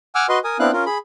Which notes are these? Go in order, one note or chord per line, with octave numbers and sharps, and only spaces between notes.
F#5 G#5 D6 E6 F6
F#4 B4 D#5 C6
A#4 G#5 D#6
B3 C4 D4 E4 F5 F#6
C#4 F4 A#4
G#4 B5